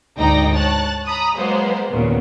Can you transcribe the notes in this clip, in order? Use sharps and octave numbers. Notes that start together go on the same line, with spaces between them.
D2 G#2 D#4 D5 G5 A#6
C#5 A5 F#6 A6
A#5 B5 D#6
F#3 G#3 A#3 B3 C5
D#2 A#2 C#3 B3